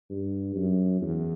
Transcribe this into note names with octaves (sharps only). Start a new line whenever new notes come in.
G2
F#2
E2